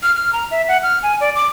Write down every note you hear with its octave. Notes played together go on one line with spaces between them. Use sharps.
F6
F6
A#5
E5
F#5
F6
G#5
D5
D6